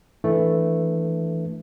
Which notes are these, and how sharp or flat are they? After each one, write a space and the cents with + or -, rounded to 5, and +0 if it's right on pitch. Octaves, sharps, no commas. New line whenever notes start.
E3 +5 A3 +0 D4 +0